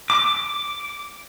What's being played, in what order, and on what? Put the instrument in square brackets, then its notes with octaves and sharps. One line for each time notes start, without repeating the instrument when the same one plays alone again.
[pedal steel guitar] D6